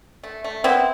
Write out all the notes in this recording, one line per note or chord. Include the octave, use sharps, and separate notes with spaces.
A3
A3
B3 C4 E4